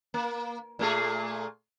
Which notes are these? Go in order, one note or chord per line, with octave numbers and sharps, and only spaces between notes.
A#3
A#2 A3 G#4